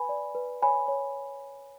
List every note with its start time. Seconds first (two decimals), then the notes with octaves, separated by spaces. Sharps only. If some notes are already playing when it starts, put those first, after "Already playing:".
Already playing: B4 G#5 B5
0.09 D5
0.35 B4
0.62 C#5 G#5 B5
0.88 C#5